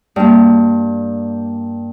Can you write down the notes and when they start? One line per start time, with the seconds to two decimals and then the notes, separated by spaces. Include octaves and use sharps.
0.16 G2 A#3